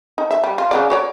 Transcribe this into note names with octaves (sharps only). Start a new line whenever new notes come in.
D#4
E5
G3
F4
C#3 F#3 D5
F#4 C#5 D5